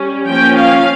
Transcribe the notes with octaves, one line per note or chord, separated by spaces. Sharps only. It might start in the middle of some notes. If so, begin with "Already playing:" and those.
Already playing: G3 C#4
F3 A#3 C#4 G5
F5